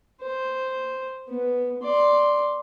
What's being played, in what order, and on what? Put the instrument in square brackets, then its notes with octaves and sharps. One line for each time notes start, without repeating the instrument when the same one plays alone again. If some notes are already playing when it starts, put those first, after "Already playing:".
[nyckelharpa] C5
B3
D5 C6